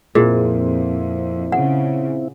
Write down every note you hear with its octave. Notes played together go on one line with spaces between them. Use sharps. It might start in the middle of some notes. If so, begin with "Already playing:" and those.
F2 A#2 C4 E4 G#4
C#3 F#5